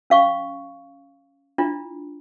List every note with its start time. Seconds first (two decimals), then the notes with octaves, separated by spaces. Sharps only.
0.10 C#4 F5 C#6
1.58 D4 E4 F4